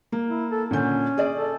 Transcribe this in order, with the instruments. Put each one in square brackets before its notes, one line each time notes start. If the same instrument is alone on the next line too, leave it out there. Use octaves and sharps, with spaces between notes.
[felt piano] A#3
[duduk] E4
A4
[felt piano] A#2 D3 G6 [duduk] C#4
[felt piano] G#4 D5
[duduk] A4